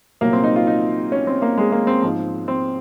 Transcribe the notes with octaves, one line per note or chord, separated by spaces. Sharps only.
C2 A#2 F#3 A#3
C4
D#4
F4
D#4
C#4
C4
A#3
G#3
A#3
C4
G#2 F3
C4